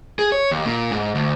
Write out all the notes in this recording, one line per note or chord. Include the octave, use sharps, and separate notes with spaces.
G#4
C#5
D#2
A#2
G#2
D2